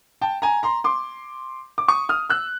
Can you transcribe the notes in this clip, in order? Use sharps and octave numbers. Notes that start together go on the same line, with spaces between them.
G5 A5
G#5 A#5
A#5 C6
C6 D6
D6
C#6 D#6
D#6 F6
E6 F#6